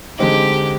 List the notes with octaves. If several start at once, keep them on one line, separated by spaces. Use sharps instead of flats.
D3 G#3 C4 D#4 G4